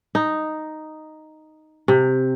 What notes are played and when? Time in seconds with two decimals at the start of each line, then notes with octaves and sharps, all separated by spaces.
0.15 D#4
1.88 C3